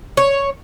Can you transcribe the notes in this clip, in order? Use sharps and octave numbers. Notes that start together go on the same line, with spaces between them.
C#5